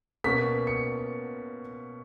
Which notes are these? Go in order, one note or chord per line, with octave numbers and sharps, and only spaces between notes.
B2 A#3 C#4 B6
C#7